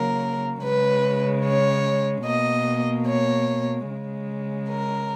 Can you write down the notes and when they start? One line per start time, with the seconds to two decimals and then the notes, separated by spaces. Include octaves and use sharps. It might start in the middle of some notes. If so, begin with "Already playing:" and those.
Already playing: C#3 F#3 A#3 A#4
0.63 C#3 G#3 B4
1.44 C#5
2.25 B2 A#3 D#5
3.06 C#5
3.88 C#3 G#3
4.69 A#4